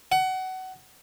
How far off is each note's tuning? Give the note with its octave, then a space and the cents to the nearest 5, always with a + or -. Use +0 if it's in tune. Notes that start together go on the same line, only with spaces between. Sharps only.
F#5 +20